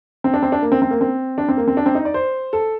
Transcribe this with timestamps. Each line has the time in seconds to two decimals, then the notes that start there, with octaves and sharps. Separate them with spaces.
0.24 C4
0.34 D4
0.43 C4
0.52 D4
0.62 A#3
0.72 C4
0.82 C4
0.91 A#3
1.01 C4
1.38 D4
1.48 C4
1.57 A#3
1.68 C4
1.77 D4
1.86 C4
1.95 D#4
2.05 D5
2.14 C5
2.53 A4